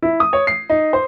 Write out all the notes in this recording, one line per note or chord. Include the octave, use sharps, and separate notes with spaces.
E4
D#6
C#5
C7
D#4
C5